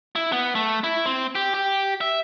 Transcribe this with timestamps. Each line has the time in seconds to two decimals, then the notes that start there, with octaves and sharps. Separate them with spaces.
0.16 E4
0.32 B3
0.55 A3
0.84 E4
1.06 C4
1.35 G4
1.54 G4
2.01 E5